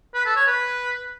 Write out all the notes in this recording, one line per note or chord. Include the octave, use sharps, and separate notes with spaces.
B4
A4
C#5
B4